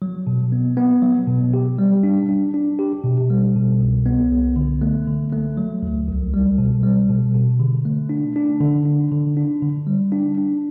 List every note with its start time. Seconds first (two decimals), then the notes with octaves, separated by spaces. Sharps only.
0.02 F#3
0.27 B2
0.52 B3
0.77 B3
1.02 F#3
1.27 B2
1.53 G4
1.78 G3
2.03 D4
2.29 D4
2.54 D4
2.79 G4
3.04 B2
3.30 G3
3.56 B2
3.80 C2
4.06 B3
4.31 C2
4.56 D3
4.82 A3
5.07 D3
5.32 A3
5.57 F#3
5.83 D2
6.08 C2
6.34 G3
6.58 B2
6.83 G3
7.10 B2
7.35 B2
7.60 D3
7.85 A3
8.09 D4
8.36 D4
8.60 D3
8.85 D4
9.12 D3
9.37 D4
9.62 D3
9.87 G3
10.12 D4
10.37 D4